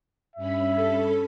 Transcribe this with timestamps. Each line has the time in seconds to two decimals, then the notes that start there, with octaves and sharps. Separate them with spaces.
0.36 G2 C#4 E5 B5
0.77 A4